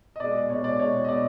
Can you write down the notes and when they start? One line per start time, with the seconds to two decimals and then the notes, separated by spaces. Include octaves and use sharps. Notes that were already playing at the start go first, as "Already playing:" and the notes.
0.16 D#5
0.20 B2 G#3 D5
0.49 B2 G#3 C#5
0.64 D5
0.79 B2 G#3 C#5
1.05 D#5
1.09 B2 D5